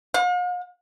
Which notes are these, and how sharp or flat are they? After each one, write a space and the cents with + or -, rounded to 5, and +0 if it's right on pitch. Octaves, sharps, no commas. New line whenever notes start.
F5 +45